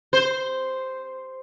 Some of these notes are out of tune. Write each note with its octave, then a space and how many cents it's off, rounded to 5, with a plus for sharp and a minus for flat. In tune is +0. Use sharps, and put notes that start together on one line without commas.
C5 -5